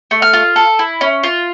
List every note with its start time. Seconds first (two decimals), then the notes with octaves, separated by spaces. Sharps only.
0.11 A3
0.22 F6
0.33 F4
0.56 A4
0.79 E4
1.01 C#4
1.23 F4